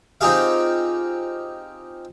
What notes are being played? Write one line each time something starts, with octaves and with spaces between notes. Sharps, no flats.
C4 D#4 F4 G4 G#4 F5